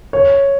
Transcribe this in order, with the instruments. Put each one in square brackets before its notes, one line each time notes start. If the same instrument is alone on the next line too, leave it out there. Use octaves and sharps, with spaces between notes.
[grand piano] C#5